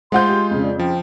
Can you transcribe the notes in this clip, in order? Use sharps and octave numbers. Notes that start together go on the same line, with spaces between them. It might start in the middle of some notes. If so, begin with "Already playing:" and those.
G#3 F4 C5 F#5 C6 G6
G4
F2 C#3
D5
F3 G5